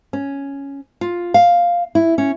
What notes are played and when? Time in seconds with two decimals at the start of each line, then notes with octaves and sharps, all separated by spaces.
0.13 C#4
1.01 F4
1.34 F5
1.95 E4
2.18 C#4